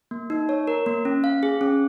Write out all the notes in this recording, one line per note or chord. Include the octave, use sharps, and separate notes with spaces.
A#3
D#4
C#5
A#4
A#3
C#4
F5
G#4
C#4